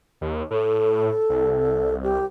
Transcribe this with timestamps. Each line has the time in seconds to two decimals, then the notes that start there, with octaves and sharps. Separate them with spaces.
0.21 D#2
0.51 A2 A4
1.29 C2
2.03 G4